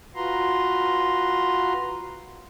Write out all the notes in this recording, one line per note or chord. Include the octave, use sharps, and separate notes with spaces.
F4 F#4 B4 A#5 C6